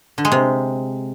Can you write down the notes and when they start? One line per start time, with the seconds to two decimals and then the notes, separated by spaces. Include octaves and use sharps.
0.18 D3
0.25 G#3
0.32 C3